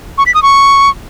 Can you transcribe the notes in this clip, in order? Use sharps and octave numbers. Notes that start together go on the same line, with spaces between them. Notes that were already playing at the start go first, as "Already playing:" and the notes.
C#6
B6
D#6
C#6